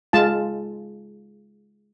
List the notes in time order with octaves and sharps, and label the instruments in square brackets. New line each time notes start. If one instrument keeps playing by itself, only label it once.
[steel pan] G#3 F4 A5